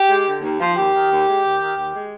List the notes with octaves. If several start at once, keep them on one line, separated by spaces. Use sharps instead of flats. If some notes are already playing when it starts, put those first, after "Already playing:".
Already playing: G4
G#3
D3
D#2
F3
D#2 G4
D#3
D#2
G#3
D#2
D#3
D#2
G#3